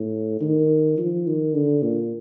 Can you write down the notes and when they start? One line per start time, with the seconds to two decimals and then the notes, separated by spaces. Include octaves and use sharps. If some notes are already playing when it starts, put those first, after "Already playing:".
Already playing: A2
0.41 D#3
0.98 F3
1.26 D#3
1.54 D3
1.82 A#2